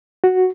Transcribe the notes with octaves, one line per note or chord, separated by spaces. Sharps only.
F#4